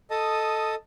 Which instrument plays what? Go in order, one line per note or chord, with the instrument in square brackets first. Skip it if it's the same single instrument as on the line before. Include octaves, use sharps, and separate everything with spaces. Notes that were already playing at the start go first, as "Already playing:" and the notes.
[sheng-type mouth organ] A4 D#5 A5 D#6